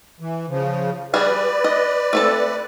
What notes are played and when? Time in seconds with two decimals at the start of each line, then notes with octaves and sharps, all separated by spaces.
0.20 E3
0.49 C#3 F3
1.14 G3 F#4 G#4 B4 D5
1.64 D#5
2.13 A3 C4 A4